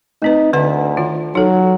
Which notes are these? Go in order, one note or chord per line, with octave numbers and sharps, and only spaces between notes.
A3 C4 D#4 B4
D2 D3 B4 F#5
D#3 F4
F#3 D#4 A4